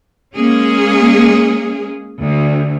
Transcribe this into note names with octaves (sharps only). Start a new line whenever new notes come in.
G#3 A#3 C#4 G#4
D2